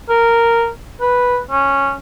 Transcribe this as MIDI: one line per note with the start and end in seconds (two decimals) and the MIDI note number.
0.09 0.69 70
1.01 1.39 71
1.51 1.93 61